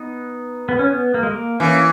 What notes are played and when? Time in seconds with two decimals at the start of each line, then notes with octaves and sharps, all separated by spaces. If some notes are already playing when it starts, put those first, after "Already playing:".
Already playing: B3 D#4
0.69 B3
0.79 C#4
0.91 B3
1.14 A#3
1.23 G#3
1.31 A#3
1.60 E3 A#3 C#4